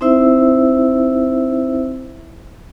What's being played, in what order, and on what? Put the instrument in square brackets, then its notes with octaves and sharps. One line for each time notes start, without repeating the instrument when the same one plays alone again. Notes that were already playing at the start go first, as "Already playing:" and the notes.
[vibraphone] C4 D#4 E4 C5 E5 E6